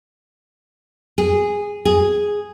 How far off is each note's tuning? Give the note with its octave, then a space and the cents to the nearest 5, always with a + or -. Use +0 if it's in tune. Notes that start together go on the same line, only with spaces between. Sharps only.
G#4 -10
G#4 -5